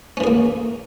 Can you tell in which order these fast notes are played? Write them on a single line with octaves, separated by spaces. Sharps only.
C#4 E3 G#4 A#3